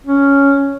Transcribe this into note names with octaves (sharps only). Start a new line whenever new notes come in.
C#4